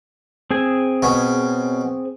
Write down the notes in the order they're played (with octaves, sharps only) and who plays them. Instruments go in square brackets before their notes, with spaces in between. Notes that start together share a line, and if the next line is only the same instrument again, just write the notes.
[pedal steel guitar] C4 G#4 G#5
[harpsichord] B2 C#4